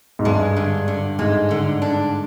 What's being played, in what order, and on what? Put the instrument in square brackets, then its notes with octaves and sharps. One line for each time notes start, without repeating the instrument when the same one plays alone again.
[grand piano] G#2
[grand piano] G2 [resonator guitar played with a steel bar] G#3
[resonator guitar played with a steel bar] D3
D3
[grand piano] G#2 [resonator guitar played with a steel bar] G#3
[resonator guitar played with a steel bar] D3
D4